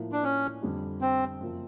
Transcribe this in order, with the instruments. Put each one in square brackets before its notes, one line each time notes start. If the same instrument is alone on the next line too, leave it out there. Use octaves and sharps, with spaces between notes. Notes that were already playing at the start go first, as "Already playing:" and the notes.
Already playing: [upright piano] A2 F3 A#3
[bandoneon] D4
C#4
[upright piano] F2 D3 G3
[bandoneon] C4
[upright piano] F#2 C#3 F3 A#3